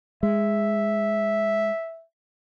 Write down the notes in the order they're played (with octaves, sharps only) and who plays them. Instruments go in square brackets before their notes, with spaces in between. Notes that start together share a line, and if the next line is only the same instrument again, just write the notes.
[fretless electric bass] G#3 [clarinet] E5